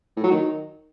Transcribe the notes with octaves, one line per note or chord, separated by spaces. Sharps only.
A2
F#3
D#3